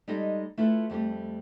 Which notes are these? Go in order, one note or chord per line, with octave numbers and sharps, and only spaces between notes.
G3 G#3 D#4 G4 A4 D#5
A3 E4 F4 A4 B4
F2 G3 A3 G4